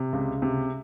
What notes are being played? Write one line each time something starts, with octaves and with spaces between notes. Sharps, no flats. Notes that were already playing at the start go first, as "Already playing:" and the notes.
Already playing: C3
C#2
C3